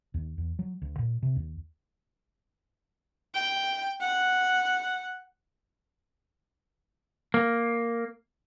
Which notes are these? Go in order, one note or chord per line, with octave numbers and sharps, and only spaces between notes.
D#2
E2
F#3
D2
A#2
C3
D#2
G5
F#5
A#3